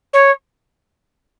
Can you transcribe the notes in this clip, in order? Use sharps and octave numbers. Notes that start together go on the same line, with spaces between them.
C#5